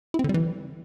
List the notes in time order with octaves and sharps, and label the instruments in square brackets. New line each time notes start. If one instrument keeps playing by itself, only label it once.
[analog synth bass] E4
C4
D3
G3
E3